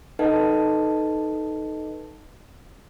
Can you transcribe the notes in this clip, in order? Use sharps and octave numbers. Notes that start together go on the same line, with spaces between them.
D#4 A4 B4 D#5 F#5 A5